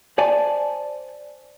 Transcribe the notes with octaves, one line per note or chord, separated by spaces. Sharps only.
C5 D5 G#5 A5